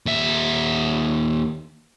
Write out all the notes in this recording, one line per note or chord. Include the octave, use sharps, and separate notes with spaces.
D#2 E5